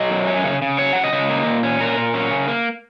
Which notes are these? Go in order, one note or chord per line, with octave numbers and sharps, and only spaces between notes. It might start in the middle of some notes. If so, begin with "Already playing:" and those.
Already playing: F#3 D#5
F#2
C#4
C#3
C#3
F#3 C#5
C#3 F#5
D#5
C#3
A#3
A#2
C#4
A#2 A#4
A#2
C#4
C#3
A#3